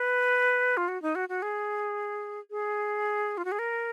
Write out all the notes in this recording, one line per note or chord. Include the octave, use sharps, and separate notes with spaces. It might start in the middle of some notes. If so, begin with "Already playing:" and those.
Already playing: B4
F4
F#4
D#4
F#4
F#4
G#4
G#4
F4
F#4
G#4
A#4